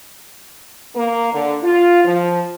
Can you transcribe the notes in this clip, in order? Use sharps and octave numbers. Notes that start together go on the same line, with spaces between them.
A#3
D3
F4
F3